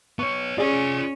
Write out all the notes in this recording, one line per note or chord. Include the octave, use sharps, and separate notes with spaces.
B3 C#5 C#6
C#4 F4 G#4 D5 G#5